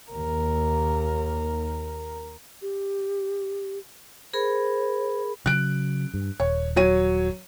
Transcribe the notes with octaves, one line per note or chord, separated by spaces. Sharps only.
D#2 A#4
G4
G#4 A#4 C5 B5
C#3 F#3 F#6 D7
G2
D#1 C#5
F#3 C#5 D#7